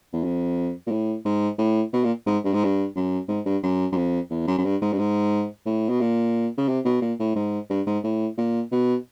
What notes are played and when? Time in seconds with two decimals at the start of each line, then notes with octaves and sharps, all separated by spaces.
0.13 E2
0.24 F2
0.87 A#2
0.91 A2
1.25 G#2
1.58 A2
1.93 B2
2.04 A#2
2.26 G#2
2.44 G2
2.53 G#2
2.64 G2
2.95 F#2
3.28 G#2
3.45 G2
3.63 F#2
3.92 F#2
3.96 F2
4.30 E2
4.47 F#2
4.58 F#2
4.64 G2
4.81 G#2
4.92 G2
4.98 G#2
5.66 A2
5.89 B2
6.01 A#2
6.57 C#3
6.68 C3
6.85 B2
7.01 A#2
7.19 A2
7.36 G#2
7.70 G2
7.87 G#2
8.04 A2
8.38 A#2
8.71 B2